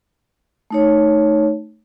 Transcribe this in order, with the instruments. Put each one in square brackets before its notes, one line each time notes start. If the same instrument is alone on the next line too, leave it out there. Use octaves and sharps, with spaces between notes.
[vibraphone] A3 D#4 C#5